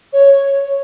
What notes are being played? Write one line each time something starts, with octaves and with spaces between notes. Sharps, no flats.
C#5